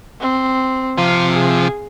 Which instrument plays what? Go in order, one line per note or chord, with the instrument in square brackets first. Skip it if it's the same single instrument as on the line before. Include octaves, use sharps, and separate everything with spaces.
[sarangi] C4
[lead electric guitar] C3 [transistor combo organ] F3 [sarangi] F5
[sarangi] G#4